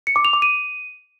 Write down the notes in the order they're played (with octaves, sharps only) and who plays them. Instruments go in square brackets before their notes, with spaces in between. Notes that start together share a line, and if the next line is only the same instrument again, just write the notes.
[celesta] C#7
D6
F7
D6
D#7